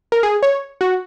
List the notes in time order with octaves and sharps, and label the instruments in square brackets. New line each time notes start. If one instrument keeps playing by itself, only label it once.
[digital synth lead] A#4
G#4
C#5
F#4